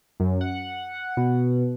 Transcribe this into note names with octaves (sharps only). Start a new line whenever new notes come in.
F#2
F#5
B2